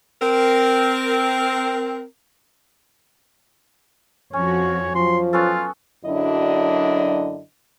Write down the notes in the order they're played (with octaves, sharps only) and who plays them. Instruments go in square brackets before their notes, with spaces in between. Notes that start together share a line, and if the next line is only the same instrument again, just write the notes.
[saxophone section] C4 A#4
[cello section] F2 F3 F#4 [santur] C#4 [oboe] C#5
[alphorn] F3 [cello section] F#3 [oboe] C6
[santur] B3 C#4 A4 [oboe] F4
[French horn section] F#2 D3 F#3 D4 E4 D#5